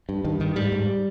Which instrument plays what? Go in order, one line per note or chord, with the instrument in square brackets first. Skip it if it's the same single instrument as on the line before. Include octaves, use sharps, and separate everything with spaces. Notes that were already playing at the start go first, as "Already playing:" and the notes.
[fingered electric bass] G2
G2 D#3
G2 D#3
G#2 G3
G#2